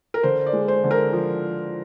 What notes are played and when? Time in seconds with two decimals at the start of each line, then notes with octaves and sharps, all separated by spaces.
0.14 A#4
0.23 D3 C5
0.46 D5
0.53 G#3
0.68 C5
0.84 D3
0.91 A#4
1.13 F3